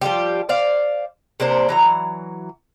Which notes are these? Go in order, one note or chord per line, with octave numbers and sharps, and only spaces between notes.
F3 G3 F4 G4
C5 D5 F5
C3 A#3 D4 C5
E3 F#3 A#5